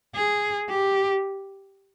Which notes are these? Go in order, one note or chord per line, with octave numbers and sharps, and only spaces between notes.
G#4
G4